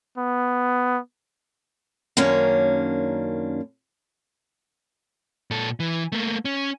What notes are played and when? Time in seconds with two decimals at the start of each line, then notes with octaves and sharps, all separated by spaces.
0.18 B3
2.17 F#2 D#3 A#3 C#4 D4
5.51 A#2 A4
5.80 E3
6.12 A3 A#3
6.45 C#4